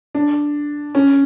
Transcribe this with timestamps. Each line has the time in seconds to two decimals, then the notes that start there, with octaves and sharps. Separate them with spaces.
0.15 D4
0.95 C#4